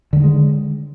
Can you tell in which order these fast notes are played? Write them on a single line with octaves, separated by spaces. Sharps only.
D3 F#3 D#3 G#3